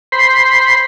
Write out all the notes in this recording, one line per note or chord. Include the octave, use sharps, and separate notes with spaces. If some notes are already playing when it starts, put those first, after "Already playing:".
C5 B5 C6